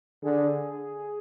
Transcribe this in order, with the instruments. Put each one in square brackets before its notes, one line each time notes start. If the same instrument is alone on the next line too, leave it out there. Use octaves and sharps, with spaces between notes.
[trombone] D3 [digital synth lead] G#4